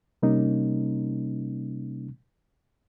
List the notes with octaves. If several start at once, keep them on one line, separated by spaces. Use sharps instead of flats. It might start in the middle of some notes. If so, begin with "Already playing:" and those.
C3 G3 A#3 C#4 D#4